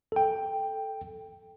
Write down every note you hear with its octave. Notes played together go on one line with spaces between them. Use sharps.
A4 G5